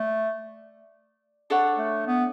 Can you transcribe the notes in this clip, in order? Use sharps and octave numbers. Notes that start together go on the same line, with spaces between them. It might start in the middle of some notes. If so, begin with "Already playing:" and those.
Already playing: A3 D5
D4 A4 C#5 F#5
A3
B3